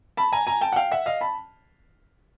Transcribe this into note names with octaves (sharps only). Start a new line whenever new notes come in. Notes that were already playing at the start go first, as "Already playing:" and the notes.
A5 B5
G#5 A#5
G#5 A#5
G5 A5
F#5
F5 G5
E5 F#5
D#5 F5
A5 B5